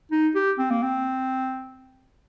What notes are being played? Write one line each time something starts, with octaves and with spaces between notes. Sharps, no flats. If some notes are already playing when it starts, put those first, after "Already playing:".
D#4
G4
C4
A#3
C4